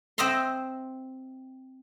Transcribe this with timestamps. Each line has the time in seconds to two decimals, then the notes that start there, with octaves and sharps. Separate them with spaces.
0.18 C4 C5 D#5 E5 A#5 C6